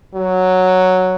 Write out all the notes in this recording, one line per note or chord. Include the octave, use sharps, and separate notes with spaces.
F#3